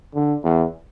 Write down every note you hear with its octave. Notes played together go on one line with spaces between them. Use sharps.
D3
E2